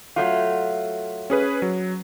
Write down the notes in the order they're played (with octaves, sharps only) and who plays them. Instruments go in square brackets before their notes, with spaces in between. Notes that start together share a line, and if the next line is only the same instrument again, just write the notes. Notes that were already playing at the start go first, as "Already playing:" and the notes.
[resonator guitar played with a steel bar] F#3 A3 F4
[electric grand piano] C#4 G#4 B4
F#3